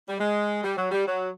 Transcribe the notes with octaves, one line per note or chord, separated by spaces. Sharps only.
G3
G#3
G3
F#3
G3
F#3